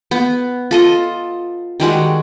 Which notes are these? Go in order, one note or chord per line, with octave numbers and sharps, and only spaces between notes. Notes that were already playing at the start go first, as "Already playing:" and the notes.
B3
F4 A4 D#5
D#3 G3 G#3 F#4